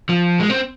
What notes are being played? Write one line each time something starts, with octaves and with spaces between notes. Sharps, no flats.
F3
G#3
C4